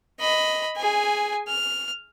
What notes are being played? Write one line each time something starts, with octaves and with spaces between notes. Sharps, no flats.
D#5 B5
G#4 G#5
F6